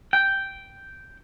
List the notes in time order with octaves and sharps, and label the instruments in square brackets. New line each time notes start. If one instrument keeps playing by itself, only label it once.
[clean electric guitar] G5